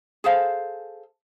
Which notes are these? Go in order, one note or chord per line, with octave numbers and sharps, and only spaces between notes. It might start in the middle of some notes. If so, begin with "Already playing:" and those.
G#4 A4 C5 F5